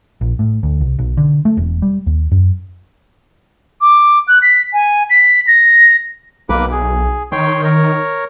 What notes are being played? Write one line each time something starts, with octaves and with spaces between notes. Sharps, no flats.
A#1
A2
D2
C2
B1
D3
A3
E1
G3
D#2
F#2
D6
F#6
B6
G#5
B6
A#6
B1 A#3 B4 D6
G#4
D#3 C#5 G5 C6
A#4 C#5